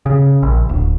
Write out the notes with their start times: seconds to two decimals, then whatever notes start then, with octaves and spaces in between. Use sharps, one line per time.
0.06 C#3
0.43 A#1
0.69 D1